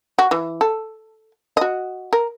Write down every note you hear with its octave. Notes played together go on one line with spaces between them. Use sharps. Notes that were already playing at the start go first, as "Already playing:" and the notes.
F#4
E3
A4
F#4 D#5
A#4